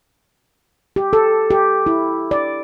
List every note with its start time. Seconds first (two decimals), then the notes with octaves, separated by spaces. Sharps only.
0.96 G4
1.13 A4
1.50 G4
1.86 E4
2.31 D5